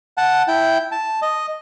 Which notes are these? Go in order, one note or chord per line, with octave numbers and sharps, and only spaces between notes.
F#5 A5
E4 G5
A5
D#5